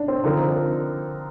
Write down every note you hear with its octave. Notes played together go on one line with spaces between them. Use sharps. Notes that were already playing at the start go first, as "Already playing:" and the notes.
Already playing: D4
C4
D3 F3 C4 D#4 F4 A#4